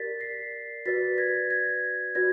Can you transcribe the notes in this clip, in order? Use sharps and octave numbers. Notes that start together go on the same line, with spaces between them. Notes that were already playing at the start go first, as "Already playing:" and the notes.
Already playing: G4 A#4 D5 A6 B6
A#6 C7
F#4 B4 D5 A6 B6
G#6 A#6
G#6 A#6
F#4 B4 D5 G#6 A#6